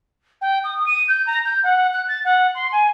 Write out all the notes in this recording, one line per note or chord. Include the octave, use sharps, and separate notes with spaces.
G5
D#6
D#7
G6
A#5
G6
F#5
F#6
A6
F#5
C6
G#5